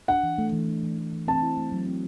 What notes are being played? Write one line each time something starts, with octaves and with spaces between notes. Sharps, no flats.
D4 F#5
E3
A3
E3
D4
E3
A3
E3
C4 A5
E4
A3
F#3
C4